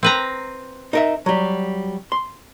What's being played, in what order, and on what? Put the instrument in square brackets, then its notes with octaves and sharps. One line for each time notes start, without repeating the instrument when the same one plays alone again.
[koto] C4 B4 A#5
[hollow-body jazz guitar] D#4 A#4 E5
F#3 G3
C6